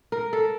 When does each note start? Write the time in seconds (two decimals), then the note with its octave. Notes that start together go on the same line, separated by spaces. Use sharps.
0.12 A#4
0.33 A4